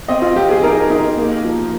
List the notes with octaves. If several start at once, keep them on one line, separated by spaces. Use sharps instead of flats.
C4 D#5
F4
F3 G4
G#4
D#4 A#4
D#4
A#3
F3